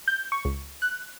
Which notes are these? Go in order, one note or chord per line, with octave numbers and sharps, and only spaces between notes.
G6
C#6
C#2
F#6